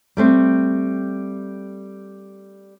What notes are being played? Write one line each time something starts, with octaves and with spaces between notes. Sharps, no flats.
G3 A3 C4